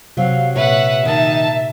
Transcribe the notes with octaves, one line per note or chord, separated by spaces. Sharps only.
C3 F#3 C4 F5 F#5
A#2 B4 C#5 E5 F#5
D#3 D#4 A5